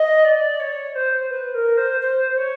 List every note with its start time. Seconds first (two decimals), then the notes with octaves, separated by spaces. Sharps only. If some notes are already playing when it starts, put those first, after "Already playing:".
Already playing: D#5
0.24 D5
0.59 C#5
0.95 C5
1.30 B4
1.54 A#4
1.77 C5
2.01 C5
2.37 C#5